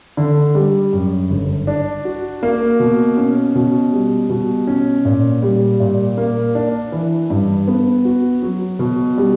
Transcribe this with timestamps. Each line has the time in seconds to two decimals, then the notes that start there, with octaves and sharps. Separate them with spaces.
0.17 D3
0.55 G3
0.93 F#2
1.30 G1
1.67 D4
2.05 F#4
2.43 A#3
2.80 B2
3.17 C#4
3.55 B2
3.92 G3
4.30 B2
4.67 C#4
5.05 A#2
5.42 G3
5.80 A#2
6.17 A#3
6.55 D4
6.92 E3
7.30 G2
7.68 B3
8.05 F#4
8.42 F#3
8.79 B2
9.18 G3